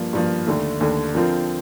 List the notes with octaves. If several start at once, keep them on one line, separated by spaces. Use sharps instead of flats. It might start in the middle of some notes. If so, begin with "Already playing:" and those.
Already playing: G2 F3 A#3
G2 F3 A#3
D#2 D3 A3
D#2 D3 A3
D3 F3 C4 F4 A#4